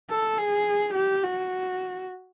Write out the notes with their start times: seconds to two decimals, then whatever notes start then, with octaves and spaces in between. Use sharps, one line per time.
0.10 A4
0.38 G#4
0.95 G4
1.24 F#4